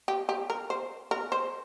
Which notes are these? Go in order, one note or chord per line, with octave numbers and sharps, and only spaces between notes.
G4
G4
A#4
C5
A#4
C5